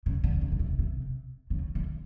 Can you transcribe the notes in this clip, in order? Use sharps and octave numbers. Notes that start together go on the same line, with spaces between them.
C#3
D3
C#3
C#3
C3
C3
C#3
D3